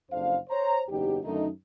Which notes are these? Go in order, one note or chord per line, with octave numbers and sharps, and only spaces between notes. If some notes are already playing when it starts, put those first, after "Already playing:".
F#1 F2 D4 C5 F5
C5 C#5 A#5
F#1 E2 F#3 D#4 G4
F#2 D3 D#3 A3 D#4